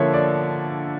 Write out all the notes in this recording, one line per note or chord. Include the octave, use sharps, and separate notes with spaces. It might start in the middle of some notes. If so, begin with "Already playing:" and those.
Already playing: D3 F3 A#3 C#5 E5
D5